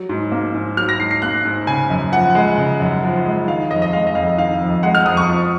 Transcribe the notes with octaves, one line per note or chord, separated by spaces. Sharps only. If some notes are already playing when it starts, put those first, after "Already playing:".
Already playing: F#3
G#2
A#3
G#2
F#3 F6
A#6
G#2 C7
C7
A#3 F#6
G#2
C#3 G#5
F#2
F3 F#5
G#3
C#3
F#2
F3
G#3
D#3 F5
F2 D#5
D#5
G#3 F5
D#5
F2 F5
D#3 F5
F2
G#3 F#5
F6
F2 D#6
C#6
F3